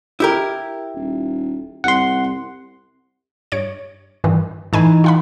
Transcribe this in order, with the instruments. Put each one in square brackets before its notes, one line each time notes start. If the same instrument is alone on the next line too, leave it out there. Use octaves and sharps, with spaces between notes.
[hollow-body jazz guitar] E4 G4 A#4
[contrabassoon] D#1
[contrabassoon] C2 [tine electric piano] F#5 C6
[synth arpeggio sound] G2 C#5 D7
G2 D#3 E3
[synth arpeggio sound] A2 G#5 B5 [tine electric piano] E3 D#4
[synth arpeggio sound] F4 F#5 B5